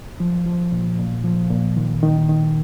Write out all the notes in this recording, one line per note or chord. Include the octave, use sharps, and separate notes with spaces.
F3
F3
A#2
A#2
F3
A#2
D#3
D#3
D#3